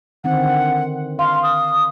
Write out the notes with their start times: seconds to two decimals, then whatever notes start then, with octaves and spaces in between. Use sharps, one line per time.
0.24 D3 D#3 C4 F#5
1.19 F5 C6
1.43 D#6